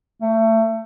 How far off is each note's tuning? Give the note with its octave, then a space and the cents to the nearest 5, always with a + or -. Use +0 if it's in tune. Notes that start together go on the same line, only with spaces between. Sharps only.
A3 +25